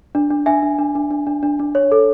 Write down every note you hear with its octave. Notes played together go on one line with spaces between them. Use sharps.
D4
D4
D4 E5 G#5
D4
D4
D4
D4
D4
D4
D4
C#5
A4